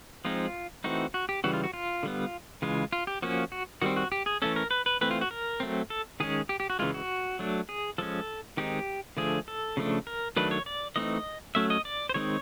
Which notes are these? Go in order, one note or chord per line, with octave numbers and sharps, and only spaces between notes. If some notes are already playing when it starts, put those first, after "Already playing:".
F3 G#3 C4 D#4 F4
E3 A3 C4 D#4 F#4
F#4
G4
C#3 E3 G3 F#4
F4
F#4
F4
D3 G3 B3
C#3 E3 G#3 F4
F4
G4
F3 A#3 C#4 F#4
F#4
D#3 G3 C4 F#4
F#4
G4
G#4
E3 A3 C#4 A4
A#4
B4
B4
E3 A3 C4 B4
F4
F#4
A#4
F#3 A3 C4
A4
D#3 G#3 C#4 G#4
G4
G4
F#4
C#3 E3 G#3 F4
F#4
F#3 A3 D4
G#4
F3 G#3 C#4 A4
D#3 G#3 C4 D#4 G4
D3 F3 A3 D4 G#4
A4
C#3 F3 A3 D4
A#4
D#3 F#3 A3 D4 B4
C#5
D5
E3 A3 C4 D#4 D#5
F#3 A3 C#4 E5
D#5
D5
C5
D#3 G#3 C4 D#4 C#5